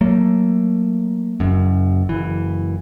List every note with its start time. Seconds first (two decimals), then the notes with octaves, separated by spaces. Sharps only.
0.01 F#3 A3 A#3
1.40 F#1 F#2
2.09 F#1 E3